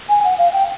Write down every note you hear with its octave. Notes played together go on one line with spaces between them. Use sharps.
G#5
F#5
F5
G5